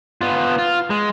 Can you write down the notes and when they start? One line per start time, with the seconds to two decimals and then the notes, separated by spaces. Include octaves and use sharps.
0.21 B3 F4
0.58 F4
0.90 G#3